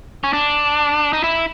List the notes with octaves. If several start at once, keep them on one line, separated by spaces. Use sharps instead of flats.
C#4
D4
D#4
E4